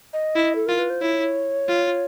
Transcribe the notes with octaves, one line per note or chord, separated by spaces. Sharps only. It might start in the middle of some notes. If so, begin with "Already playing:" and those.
D#5
E4
A4
F4 A#4
B4
C5
E4 C#5
F4